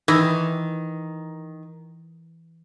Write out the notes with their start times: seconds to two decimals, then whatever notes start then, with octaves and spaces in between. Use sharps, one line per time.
0.08 D#3 E3